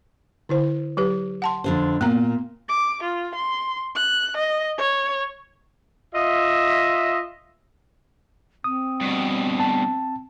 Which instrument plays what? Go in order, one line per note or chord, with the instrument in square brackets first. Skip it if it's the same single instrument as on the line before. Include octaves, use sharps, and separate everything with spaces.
[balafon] D3 E4 C5
F#3 G4 B4
F#5 A5 C6
[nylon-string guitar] F2 D3 C5
[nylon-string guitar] A#2 [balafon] B3 A#5
[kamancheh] D6
F4
C6
F#6
D#5
C#5
[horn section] F4 D#5 E5
[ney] C4 [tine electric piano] D#6
[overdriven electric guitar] G2 B2
[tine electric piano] A5